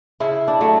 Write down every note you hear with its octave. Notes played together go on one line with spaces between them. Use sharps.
C#3 E4
D4
F#3 A3